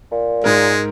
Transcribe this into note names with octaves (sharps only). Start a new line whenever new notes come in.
A#2
G#2 G#3 A#4